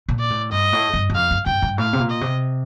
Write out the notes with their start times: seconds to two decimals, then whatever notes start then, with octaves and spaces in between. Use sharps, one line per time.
0.09 A#2
0.19 D5
0.30 A2
0.52 G2 D#5
0.73 A2
0.93 G2
1.10 G2
1.15 F2 F5
1.31 G2
1.46 G2 G5
1.62 G2
1.78 A2 F5
1.93 C3
2.00 A#2
2.10 D#5
2.21 C3